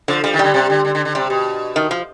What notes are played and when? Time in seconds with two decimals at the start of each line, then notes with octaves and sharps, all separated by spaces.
0.08 D3 F3
0.24 F3 G3
0.34 D#3
0.39 D3 G3
0.54 C3
0.70 D3
0.85 D3
0.95 D3
1.05 D3
1.15 C3 G3
1.30 B2
1.76 D#3
1.91 F3